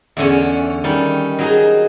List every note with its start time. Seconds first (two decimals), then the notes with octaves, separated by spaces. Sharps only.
0.17 E2 D3 C#4
0.84 D#3 G3 C#4 D#4
1.39 F#3 D#4 G#4